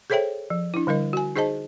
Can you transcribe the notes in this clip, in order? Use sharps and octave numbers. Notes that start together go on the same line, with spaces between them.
G#4 A4 C5 C#5 E5 G5
F3
D4 E4
D3 G3 A#4 D#5
F#4 G#5
D#4 G#4 C5 D#5 A5